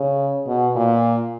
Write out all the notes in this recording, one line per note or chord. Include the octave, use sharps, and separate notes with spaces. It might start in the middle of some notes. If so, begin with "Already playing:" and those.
Already playing: C#3
B2
A#2